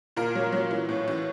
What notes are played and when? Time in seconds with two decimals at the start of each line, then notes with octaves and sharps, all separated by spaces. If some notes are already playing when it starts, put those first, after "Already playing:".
0.16 A#2 A#4
0.35 F#3
0.52 F#3
0.71 E3
0.89 A2
1.08 E3